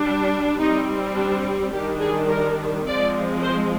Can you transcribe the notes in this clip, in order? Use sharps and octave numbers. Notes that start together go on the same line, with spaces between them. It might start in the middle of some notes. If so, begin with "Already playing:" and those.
Already playing: G3 D4
G3 C4 D#4
D4
D#3 G3 D4 G4
G#4
A#4
F3 G#3 C4 D5
C5